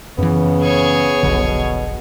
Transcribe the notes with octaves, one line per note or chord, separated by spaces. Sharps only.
F#2 C#3 E3 B3
G#4 C#5
F1 B1 B2 D3